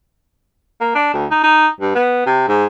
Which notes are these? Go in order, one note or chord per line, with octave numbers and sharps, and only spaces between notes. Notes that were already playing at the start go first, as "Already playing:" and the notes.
A#3
D4
D2
D#4
D#4
G2
B3
C3
G#2